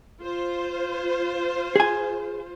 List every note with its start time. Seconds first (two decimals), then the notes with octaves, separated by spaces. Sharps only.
0.22 F4 C5
1.76 G#4 G#5